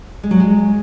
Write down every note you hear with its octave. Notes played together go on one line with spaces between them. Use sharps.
G#3
F#3
G#3